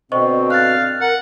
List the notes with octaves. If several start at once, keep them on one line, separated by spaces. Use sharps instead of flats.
B2 D3 C4 C5 D#5 C#6
F5 F#6 A6
A#4 F#5